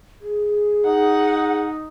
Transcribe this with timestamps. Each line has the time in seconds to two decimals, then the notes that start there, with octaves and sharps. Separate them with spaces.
0.20 G#4
0.85 D#4 F#5